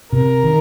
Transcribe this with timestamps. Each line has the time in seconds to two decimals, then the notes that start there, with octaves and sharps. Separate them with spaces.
0.12 C3 A#4
0.44 D#3